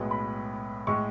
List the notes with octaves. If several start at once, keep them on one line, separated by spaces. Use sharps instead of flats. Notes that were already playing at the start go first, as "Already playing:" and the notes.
Already playing: B1 A2 G#3 B3
B5
A2 G#3 C#6